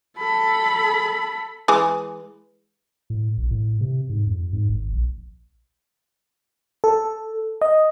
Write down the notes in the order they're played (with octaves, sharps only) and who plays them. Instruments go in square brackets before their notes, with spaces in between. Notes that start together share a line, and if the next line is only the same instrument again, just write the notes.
[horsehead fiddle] A4 B5
[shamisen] E3 G#3 G#4
[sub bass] A2
A#1
A2
C3
G#2
F2
G#2
G#1
A#1
[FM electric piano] A4
D#5